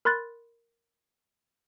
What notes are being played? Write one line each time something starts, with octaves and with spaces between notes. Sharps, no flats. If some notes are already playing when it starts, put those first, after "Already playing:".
A#4 B5 C6 F#6 A6